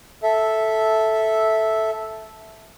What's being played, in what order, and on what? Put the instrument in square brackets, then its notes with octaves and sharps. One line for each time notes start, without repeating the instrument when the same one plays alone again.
[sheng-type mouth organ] A4 E5